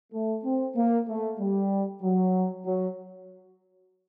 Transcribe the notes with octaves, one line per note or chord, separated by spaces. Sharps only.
A3
C4
A#3
A3
G3
F#3
F#3